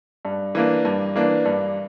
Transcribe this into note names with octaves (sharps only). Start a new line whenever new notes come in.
G2
E3 A#3 D4
G2
E3 A#3 D4
G2